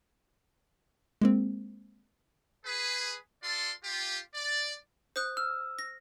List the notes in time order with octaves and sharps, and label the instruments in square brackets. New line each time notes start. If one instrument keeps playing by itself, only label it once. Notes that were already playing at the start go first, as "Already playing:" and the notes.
[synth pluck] G#3 A#3 C4
[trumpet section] G#4 B4
F4 A4 D5 C6
F4 G4
D5
[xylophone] C5 D#6 F#6
[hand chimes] E6 [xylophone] F6
[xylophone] A#6